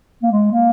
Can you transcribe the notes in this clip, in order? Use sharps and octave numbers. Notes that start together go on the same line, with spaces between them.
A#3
G#3
A#3